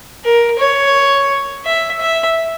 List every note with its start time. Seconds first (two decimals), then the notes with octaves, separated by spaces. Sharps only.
0.24 A#4
0.59 C#5
1.66 E5
2.01 E5